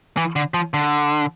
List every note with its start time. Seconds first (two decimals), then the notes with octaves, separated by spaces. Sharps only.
0.17 E3
0.36 D3
0.54 F3
0.74 D3